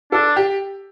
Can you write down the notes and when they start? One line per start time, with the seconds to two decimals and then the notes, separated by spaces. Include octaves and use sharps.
0.12 D4 A4
0.36 G4